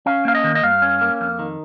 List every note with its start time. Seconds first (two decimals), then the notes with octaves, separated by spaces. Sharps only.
0.06 C#4 F5
0.25 A#3 F5
0.35 D#5
0.44 D#3
0.55 D#5
0.63 G2 F5
0.82 C#4
1.01 A#3
1.21 F2
1.39 D#3